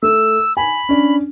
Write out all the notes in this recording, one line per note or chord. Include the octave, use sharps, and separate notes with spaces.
A3 E6
G#5 B5
C#4 D4